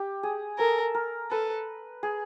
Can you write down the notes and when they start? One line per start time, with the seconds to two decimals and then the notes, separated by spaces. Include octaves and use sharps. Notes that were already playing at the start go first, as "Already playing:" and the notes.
Already playing: G4
0.23 G#4
0.59 A4 A#4
0.95 A#4
1.31 A4 B4
2.03 G#4